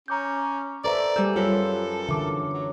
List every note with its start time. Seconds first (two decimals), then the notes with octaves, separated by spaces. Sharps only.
0.08 C#4 A#5 D6 G6
0.84 A4 B4 C5 D5 E5 A#5
1.16 G3 G#4 A4 G#5 E6 G6
1.36 F#2 F4 A4 B4
2.08 D3 E3 A#4 E5 D6
2.54 F#3